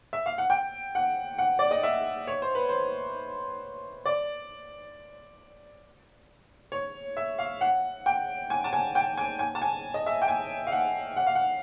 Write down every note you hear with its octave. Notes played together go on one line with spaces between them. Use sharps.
E5
F5
F#5
G5
F#5
F#5
D5
D#5
E5
C#5
C5
B4
C5
D5
C#5
E5
F5
F#5
G5
G#5
A5
G#5
G5
G#5
G#5
A5
G#5
D#5
E5
G5
G#5
F5
F#5
F#5
F5
F#5